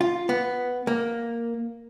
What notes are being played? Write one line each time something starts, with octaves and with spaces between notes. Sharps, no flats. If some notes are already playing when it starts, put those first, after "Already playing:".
F4
B3
A#3